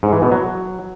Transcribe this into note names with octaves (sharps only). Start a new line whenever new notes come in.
G#2
E3
B2
F#3